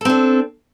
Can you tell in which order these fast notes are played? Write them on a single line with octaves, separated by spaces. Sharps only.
A4 C4 D4